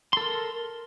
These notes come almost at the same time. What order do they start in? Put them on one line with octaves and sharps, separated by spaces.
C6 A4 A#4